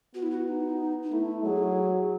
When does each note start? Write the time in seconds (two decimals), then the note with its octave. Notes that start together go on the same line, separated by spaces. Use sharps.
0.15 B3 F#4
0.23 E4
0.31 F#4
0.47 D#4
1.03 D#4
1.12 A3 E4
1.44 F#3 G#4